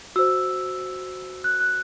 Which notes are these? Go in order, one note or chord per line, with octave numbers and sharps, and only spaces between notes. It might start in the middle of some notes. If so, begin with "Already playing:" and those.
F#4 C5 E6
F#6
F#6